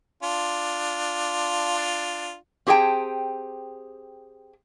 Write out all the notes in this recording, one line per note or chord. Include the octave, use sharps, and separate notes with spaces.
D4 F4
C4 G4 G#4 D5 G5 A5